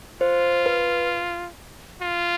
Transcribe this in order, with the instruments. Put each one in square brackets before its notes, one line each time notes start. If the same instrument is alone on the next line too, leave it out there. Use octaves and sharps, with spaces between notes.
[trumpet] F4 [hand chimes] C5
[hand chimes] B4
[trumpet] F4